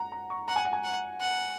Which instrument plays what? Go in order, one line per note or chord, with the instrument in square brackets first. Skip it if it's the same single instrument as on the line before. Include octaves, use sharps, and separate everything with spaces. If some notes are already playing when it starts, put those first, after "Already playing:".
Already playing: [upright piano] F#5 A#5
A#5
C#6
[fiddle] F#5 [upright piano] A#5
[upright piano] G#5
F#5
G#5
[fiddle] F#5
F#5